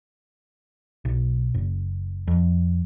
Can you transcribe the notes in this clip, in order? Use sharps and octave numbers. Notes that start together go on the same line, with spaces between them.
B1
F#1
F2